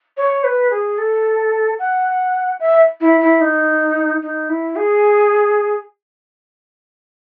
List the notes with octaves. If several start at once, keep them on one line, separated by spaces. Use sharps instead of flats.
C#5
B4
G#4
A4
F#5
E5
E4
E4
D#4
D#4
E4
G#4